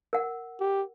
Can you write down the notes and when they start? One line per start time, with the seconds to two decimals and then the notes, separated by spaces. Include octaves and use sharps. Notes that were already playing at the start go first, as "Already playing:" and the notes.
0.13 A#4 F#5
0.60 G4